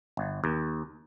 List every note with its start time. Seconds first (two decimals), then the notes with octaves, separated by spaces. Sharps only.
0.17 G1
0.44 D#2